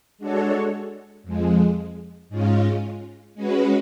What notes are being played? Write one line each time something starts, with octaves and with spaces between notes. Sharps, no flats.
G#3 D4 F#4 A4 C#5
F2 F3 G#3
G#2 G#3 C#4 F4
G#3 C#4 F#4 B4